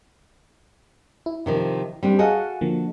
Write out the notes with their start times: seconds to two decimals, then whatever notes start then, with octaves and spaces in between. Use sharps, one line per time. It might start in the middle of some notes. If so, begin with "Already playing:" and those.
1.26 E4
1.46 C3 D#3 F3
2.03 G3 C4 D4
2.19 F#4 G#4 A4 D#5 F5 F#5
2.61 D3 F3 A#3